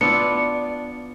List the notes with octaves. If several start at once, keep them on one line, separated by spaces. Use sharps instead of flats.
B3 D4 E4 F4 D5 C#7